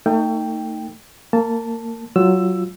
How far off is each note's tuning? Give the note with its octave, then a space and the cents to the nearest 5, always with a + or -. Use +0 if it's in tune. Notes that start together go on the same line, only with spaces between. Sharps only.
A3 +40 D#4 +0 G5 +0
A#3 -25 A5 +0
F#3 +10 F4 +0 E6 +10